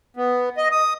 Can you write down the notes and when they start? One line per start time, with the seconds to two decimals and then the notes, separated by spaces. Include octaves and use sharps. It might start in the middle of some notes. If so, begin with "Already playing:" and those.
0.17 B3
0.57 D#5
0.72 D#6